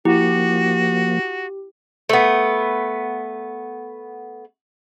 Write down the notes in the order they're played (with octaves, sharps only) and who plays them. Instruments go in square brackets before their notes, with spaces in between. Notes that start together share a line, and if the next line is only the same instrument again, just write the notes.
[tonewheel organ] F3 A#3 [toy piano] E4 [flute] F#4 [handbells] G4
[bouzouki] A3 B3